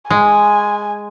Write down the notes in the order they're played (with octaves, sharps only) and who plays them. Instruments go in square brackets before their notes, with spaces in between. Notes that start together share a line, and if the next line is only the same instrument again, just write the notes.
[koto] G#3 [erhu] G#5